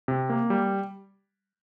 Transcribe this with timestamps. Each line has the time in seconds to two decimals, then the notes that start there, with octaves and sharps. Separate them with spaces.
0.08 C3
0.30 A#3
0.50 G3